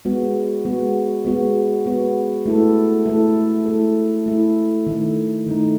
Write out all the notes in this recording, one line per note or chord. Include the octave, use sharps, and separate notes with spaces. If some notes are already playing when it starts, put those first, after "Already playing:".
G#3 B3 F#4
G#3 B3 F#4
G#3 B3 F#4
G#3 B3 F#4
A3 E4 A4
A3 E4 A4
A3 E4 A4
A3 E4 A4
D#3 A3 D#4
D#3 A3 D#4